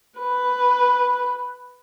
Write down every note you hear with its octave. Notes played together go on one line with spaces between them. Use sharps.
B4